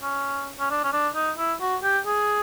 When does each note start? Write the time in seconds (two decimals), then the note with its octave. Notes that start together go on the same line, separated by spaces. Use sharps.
0.03 C#4
0.60 C#4
0.71 D4
0.84 C#4
0.93 D4
1.16 D#4
1.38 E4
1.61 F#4
1.83 G4
2.06 G#4